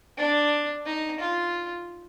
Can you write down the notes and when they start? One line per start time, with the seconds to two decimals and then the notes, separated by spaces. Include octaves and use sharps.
0.18 D4
0.86 D#4
1.20 F4